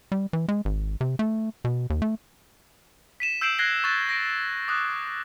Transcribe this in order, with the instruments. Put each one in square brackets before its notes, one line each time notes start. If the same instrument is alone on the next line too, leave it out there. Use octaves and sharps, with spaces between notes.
[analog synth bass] G3
E3
G#3
G#1
C3
A3
B2
D#2
A3
[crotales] B6 D#7 E7
E6 G6 C7 D7 E7 F#7
F#6 G#6 A#6 C7 G7
C#6 F#6 A6 E7
A#6 D7
D6 D#6 F#6